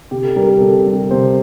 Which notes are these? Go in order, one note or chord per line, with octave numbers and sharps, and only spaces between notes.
C3 G4
A4
G3 A#4
A#4
C3 A4
G3
C3 C5